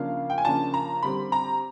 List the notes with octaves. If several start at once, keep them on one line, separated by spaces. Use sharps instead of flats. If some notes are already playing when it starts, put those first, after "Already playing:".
Already playing: C#3 F3 A#3 D4 F5
G5
G#5
C#3 F3 A#3 D4 A5
A#5
D3 G3 C4 B5
A#5